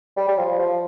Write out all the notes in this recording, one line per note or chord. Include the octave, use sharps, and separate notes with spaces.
G3
G3
F3
F3